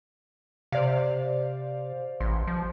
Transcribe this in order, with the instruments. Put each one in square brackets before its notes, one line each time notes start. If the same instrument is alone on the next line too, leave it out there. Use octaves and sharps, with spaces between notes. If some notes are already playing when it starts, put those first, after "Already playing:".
[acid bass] C3 [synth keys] C5 D5 F5
[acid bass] A1 [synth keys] C6
[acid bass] F3